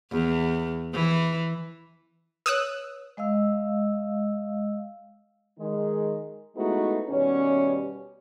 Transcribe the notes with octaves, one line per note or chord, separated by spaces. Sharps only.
E2
E3
B4 C#5 D#6 E6 F#6
G#3 D#5 F5 E6
D#3 G#3 D#4
G#3 A3 B3 D#4 E4 F#4
D#2 B2 G3 C#4